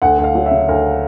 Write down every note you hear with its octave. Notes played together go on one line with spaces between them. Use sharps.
D2 F#5
D2
F5
F#3
E5
C#3
D2 A#4